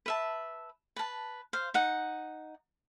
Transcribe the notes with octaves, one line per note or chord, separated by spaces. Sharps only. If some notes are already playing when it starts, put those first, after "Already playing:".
B4 E5 A5
B4 A5
C5 F5
D#4 F#5